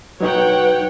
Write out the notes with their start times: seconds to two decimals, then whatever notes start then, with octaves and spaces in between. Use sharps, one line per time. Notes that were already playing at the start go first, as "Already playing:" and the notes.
0.21 F#3 D#4 F#4 B4 C#5 F#5 G5